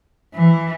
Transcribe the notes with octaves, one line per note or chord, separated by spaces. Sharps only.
E3